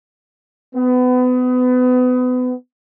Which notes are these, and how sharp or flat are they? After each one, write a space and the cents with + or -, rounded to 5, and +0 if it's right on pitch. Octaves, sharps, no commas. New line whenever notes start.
B3 +30